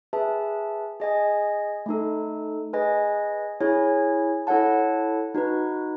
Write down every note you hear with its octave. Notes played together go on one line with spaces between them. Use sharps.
G#4 B4 E5 A5
G#4 D#5 G#5
A3 D#4 A4
G#4 B4 D#5 G#5
E4 G#4 C#5 G#5
E4 A4 C#5 F#5 A5
D#4 F#4 B4